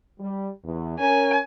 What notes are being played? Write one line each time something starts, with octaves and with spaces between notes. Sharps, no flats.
G3
E2
C#4 A#4 G#5